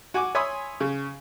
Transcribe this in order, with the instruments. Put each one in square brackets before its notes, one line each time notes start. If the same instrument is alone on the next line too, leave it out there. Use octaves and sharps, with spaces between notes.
[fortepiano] F#4 G#5 D6
C#5 E5 G#5 B5 C6 D#6
C#3